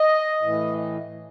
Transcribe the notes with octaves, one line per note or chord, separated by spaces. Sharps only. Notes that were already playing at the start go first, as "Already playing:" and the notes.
Already playing: D#5
A2 E3